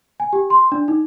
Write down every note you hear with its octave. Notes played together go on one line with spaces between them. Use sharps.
G#5
G4
C6
D4
D#4